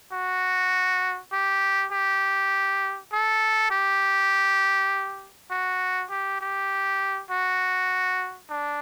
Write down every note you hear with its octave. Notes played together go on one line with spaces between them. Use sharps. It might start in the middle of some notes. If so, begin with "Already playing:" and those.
F#4
G4
G4
A4
G4
F#4
G4
G4
F#4
D4